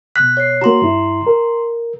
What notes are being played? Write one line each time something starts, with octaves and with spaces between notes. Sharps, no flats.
B2 F#6 B6
C#5 C7
A#3 F#4 A#5 C6
G2 E4
A#4